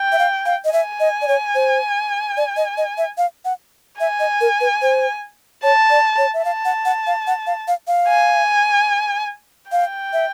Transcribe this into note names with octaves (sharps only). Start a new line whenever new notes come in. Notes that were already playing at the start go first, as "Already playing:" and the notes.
Already playing: G5
E5
F5
F5
D#5
E5 G#5
D#5
D5
C#5
C5
D5
D#5
D#5
E5
F5
F#5
E5 G#5
D#5
A#4
B4
C5
C#5 A5
D5
C#5
E5
F5 A5
F#5
F#5
F5
F#5
F5
F5
F5
G#5
F5 G5
E5